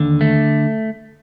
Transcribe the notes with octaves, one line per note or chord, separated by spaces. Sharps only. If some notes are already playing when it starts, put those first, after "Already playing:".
Already playing: D#2 D3
A3